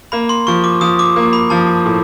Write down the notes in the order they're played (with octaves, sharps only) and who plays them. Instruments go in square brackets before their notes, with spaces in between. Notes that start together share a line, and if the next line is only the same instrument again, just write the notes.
[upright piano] A#3 [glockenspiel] B5
[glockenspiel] C6
[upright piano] F3 [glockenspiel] C#6
[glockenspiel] D6
[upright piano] F3 [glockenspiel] D#6
[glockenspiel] D6
[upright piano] A#3
[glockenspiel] B5
[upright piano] F3 [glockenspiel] A5
[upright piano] A2